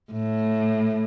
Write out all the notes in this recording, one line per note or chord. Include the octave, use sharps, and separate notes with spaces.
A2